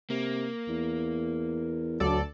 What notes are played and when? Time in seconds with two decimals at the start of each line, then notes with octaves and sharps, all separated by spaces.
0.10 C3 A#3
0.68 E2
2.00 D2 F#3 A4 D5